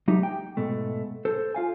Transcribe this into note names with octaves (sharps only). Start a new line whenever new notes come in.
F#3 A3 D#4 G4
G5
G#2 B2 A3
A4 C5
F4 F5 G#5